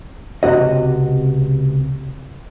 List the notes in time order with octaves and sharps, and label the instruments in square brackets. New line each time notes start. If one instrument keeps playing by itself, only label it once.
[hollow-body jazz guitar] C#2 C3 F3 F#4 D#5